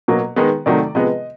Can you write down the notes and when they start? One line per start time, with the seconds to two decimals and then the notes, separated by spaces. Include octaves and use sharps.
0.08 B2 F#3 A#3
0.36 D#3 G#3 B3
0.66 C3 D#3 F#3 A3 D5
0.95 C3 F3 G#3 B3 D#5